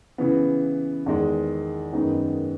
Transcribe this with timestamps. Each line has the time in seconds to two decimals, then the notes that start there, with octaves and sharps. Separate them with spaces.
0.18 C#3 E3 B3
1.06 E2 D#3 G#3
1.93 F#2 D#3 G#3 B3 D#4